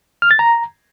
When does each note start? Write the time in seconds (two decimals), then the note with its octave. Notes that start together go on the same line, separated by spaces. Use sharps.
0.22 F6
0.31 A6
0.39 A#5